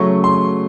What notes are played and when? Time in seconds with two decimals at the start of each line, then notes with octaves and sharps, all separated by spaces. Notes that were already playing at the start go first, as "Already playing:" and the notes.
Already playing: C#3 F#3 A3 C#6
0.24 C6